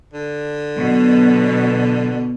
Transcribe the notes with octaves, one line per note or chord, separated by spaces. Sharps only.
D3
B2 F#3